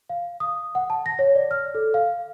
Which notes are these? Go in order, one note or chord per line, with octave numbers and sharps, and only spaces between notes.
F5
D#6
F#5
A5
A#6
C#5
D5
F6
A4
F5